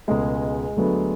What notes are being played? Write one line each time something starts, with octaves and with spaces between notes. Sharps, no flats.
C#2 B2 G#3 A3 G#4
D2 D3 F#3 B3